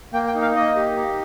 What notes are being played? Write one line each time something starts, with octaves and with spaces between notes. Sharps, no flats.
A#3 G5
G5
D#4
F5
A#3 D#5
G4
D#4